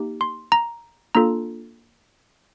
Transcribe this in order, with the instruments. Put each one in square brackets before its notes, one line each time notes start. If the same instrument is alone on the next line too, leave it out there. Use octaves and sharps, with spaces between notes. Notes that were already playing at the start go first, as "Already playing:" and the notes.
Already playing: [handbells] A#3 D#4 G4
C6
A#5
A#3 D4 F4 A4 A#5